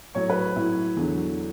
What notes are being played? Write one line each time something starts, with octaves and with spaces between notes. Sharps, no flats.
A2 F#3 C#5
B4
A2 F#3 E4
E2 D3 F#3